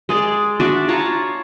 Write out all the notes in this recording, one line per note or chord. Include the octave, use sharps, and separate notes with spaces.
G#3 G#4 D5
D4 F#4 D5 E5
F4 C#5 A5 A#5